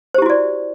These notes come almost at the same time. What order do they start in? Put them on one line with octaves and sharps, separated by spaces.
C5 G4 E4 F#4 D5